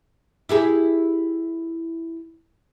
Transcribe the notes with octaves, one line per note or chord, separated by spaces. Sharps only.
E4 G4 G#4